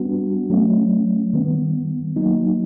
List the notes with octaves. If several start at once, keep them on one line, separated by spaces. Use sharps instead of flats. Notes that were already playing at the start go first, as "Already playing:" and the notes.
Already playing: G3 B3 D4 F#4
F#3 A3 C#4
D#3 G3 B3
F#3 A#3 D#4